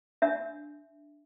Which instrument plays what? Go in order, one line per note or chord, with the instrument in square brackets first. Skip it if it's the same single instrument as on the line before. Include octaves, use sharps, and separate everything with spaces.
[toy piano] D4 E5